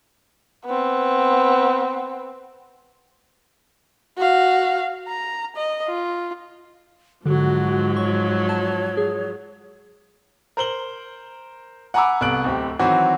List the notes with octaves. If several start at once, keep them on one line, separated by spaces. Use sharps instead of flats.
B3 C4
F#4 F5
A#5
D#5
F4
G#2 D3 F3 F#3 F#4
C#5 C#6
A5
G#4
A#4 C5 F#7 G7
F#5 G#5 A#5 B5 D6 E6
C2 B3 A4 F#6 D7 F#7
D1 C4 G4
D#3 E3 F#3 C4 F#4 C5